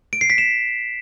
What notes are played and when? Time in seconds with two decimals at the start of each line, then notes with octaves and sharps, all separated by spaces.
0.13 D7
0.21 C7
0.30 B6
0.38 E7